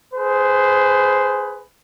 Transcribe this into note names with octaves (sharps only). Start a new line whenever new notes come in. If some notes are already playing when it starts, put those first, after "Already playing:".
G#4 B4 C5